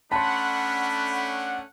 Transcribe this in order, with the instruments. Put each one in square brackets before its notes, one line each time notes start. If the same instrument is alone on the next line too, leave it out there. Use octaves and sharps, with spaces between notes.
[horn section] A3 C#4 D4 [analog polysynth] F#5 [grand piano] A5 C6 [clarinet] B5